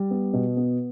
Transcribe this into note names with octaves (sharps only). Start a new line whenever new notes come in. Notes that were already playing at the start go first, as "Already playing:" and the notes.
Already playing: G3
B3
B2
B3